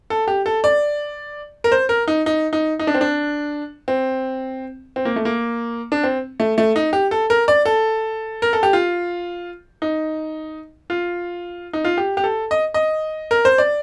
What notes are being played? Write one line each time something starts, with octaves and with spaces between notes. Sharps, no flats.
A4
G4
A4
D5
A#4
C5
A#4
D#4
D#4
D#4
D#4
D4
C4
D4
C4
C4
A#3
A3
A#3
D4
C4
A3
A3
D#4
G4
A4
A#4
D5
A4
A#4
A4
G4
F4
D#4
F4
D#4
F4
G4
G4
A4
D#5
D#5
A#4
C5
D5